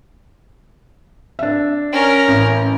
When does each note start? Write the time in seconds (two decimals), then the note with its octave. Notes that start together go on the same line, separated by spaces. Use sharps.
1.39 D4 E5
1.92 C#4 A#4
2.28 A1